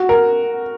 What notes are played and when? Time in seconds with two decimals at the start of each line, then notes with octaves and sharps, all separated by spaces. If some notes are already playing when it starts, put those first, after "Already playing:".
Already playing: F#4
0.09 A#4